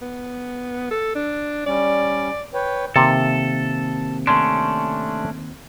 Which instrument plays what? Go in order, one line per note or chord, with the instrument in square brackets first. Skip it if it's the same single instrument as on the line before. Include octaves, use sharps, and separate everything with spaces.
[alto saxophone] B3
A4
D4
[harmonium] G3 C#4 [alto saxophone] D5
[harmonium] B4 C#5 G5
[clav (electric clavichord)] C3 [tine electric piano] D#3 A#3 C4 [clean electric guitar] A4
[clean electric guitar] A3 C#4 D4 [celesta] C6